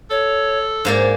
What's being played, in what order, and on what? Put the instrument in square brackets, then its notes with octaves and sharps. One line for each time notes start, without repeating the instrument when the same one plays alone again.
[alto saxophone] A4 [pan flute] C#5
[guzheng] G#2 A#3 D5 [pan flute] C5